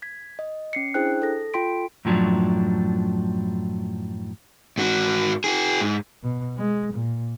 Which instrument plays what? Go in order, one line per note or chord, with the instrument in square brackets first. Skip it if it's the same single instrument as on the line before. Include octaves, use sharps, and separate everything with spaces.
[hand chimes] G#6 B6
D#5
C#4 C7 C#7
D4 E4 G#4 C5 G5 F#6
A4 A#6
F4 A4 G5 C6 B6 D7
[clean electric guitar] F#2 A2 F3 F#3 D4
[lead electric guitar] G#2 F#4
F#4 G#4
G#2
[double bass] B2
G#3
A#2